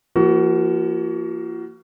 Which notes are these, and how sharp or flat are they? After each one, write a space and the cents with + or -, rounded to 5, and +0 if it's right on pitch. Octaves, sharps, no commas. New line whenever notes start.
F3 -35 A#3 +0 F#4 +25